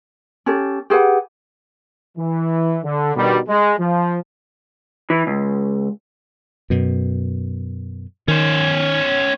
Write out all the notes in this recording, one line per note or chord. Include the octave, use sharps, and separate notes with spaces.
C#4 G4 A4
G4 G#4 B4 F#5
E3
D3
B2 D3 D#3 G3
G#3
F3
E3
C#2
F#2 B2
D#3 C#4 C5